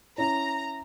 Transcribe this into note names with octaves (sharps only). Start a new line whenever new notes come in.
C#4 E4 C#5 A#5